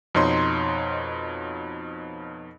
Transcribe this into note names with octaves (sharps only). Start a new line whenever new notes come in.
F2 B2 D#4 C#5 C6